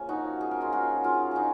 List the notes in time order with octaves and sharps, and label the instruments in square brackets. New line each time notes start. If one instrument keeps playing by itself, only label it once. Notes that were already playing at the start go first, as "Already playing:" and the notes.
Already playing: [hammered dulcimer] C#3 F3 A#3 C#4
D#4 F#4
G#4
A#4
F4 G#4
F#4 A#4
F4 G#4
D#4 F#4 G#4